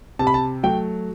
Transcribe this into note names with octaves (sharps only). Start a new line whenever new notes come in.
C3 A5
B5
A5
F#3 A3 G5